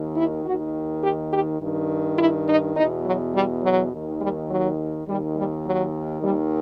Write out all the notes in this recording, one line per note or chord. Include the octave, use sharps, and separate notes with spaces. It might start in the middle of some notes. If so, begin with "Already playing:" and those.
Already playing: D#2 D#3
E4
D#2 D#3 F#4
G4
G4
G2 D#3
E4
D#4
E2 B2 D#4
F#3
G3
F#3
D#2 D#3
G3
F#3
D#2 D#3 G3
G3
F#3
D#2 D#3 G3